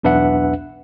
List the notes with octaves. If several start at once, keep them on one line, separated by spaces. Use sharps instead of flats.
B1 E2 D4 B4 E5 F#5